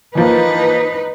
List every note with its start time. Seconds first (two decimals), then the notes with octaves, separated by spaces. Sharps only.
0.15 E3 F3 A#3 D#4 B4